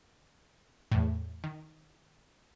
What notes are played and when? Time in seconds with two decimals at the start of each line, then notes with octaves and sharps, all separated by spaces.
0.92 E2 A2
1.44 D#3